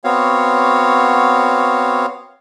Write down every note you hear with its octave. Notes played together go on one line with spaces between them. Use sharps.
B3 C4 F#4 C#5 F5